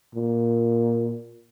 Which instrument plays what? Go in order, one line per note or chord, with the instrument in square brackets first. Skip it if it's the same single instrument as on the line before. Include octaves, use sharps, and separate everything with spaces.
[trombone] A#2